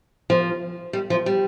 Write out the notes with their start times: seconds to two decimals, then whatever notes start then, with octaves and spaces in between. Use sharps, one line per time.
0.30 F3
0.93 G3
1.10 F3
1.26 G3